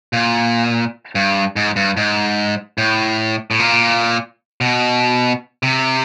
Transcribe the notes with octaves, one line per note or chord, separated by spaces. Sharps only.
A#2
G2
G#2
G2
G#2
A2
A2
A#2
B2
C3